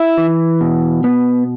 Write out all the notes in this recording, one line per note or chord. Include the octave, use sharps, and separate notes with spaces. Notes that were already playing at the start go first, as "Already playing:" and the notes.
Already playing: E4 E5
E3
B2
B3